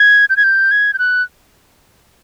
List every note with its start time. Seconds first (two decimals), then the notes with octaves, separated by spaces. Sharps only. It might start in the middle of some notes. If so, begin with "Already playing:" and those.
Already playing: G#6
0.30 G6
0.37 G#6
0.44 G6
0.71 G#6
0.94 G6
0.99 F#6